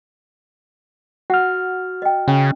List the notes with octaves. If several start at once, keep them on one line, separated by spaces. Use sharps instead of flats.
F#4 F#5 F6
D#5 G5
C#3 C#4